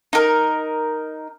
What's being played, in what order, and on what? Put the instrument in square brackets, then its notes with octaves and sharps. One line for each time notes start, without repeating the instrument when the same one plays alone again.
[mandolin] D#4 A#4